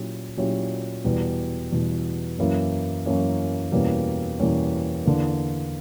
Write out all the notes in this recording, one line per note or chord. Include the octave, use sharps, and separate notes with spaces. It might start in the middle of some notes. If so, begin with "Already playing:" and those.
Already playing: A#2 F#3 C#4 E4 G4
A#2 F#3 C#4 E4 G4
E2 B2 G3
E2 B2 G3
F#2 E3 A#3 C#4 E4
F#2 E3 A#3 C#4 E4
E2 B2 G3 A#3 C#4
E2 B2 G3 A#3 C#4
E2 D3 A#3